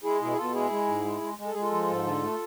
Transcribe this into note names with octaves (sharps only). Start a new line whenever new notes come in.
G#3 E4 G#4
B2 E4 G#4
G#4
B2 F4 A4
G#3 E4 G#4
G#3
G#2
G#3
G#3
G#3
A4
G#3 G#4
F4 A4
F3
G#2
D3
A3